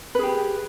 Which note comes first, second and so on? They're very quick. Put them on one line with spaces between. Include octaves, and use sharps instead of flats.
B4 G#4 G4